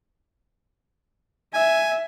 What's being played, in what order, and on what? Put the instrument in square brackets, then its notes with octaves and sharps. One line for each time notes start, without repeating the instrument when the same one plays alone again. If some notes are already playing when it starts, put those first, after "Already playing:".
[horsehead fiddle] E5 [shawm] G#5